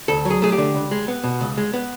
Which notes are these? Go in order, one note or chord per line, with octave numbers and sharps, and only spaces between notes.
D2 A4
F#3
G#4
A3 G#4
G4
D3
C#2
G#3
B3
B2
C#2
G#3
B3